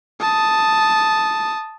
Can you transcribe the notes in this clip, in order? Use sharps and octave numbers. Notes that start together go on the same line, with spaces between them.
A5 D#6